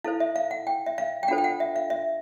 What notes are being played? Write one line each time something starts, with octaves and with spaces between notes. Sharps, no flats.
E4 A4 C5 F5
E5
F5
F#5
G5
E5
F5
G5
D4 F4 A4 C5 F#5
G5
F#5
E5
F5
E5